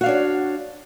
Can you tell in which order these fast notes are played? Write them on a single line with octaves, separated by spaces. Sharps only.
F#4 F5 D4 C#5